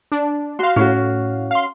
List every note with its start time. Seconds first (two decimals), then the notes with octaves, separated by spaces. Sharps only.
0.12 D4
0.59 F#4 F5 C6
0.76 A2 C#4 F#4 F5
1.51 F5 C6